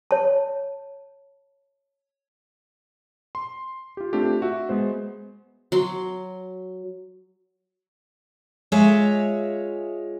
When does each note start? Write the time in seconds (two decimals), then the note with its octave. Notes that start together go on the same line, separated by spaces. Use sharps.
0.11 C#5 A5
3.35 C6
3.97 F4 G4
4.13 A3 C4 D4 F4 G4
4.42 F#4 E5
4.69 G#3 B3 C5
5.72 F#3 C6
8.72 G#3 F4 C#5 E5